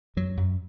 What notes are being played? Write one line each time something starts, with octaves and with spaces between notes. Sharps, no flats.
F#2 F#3
F#2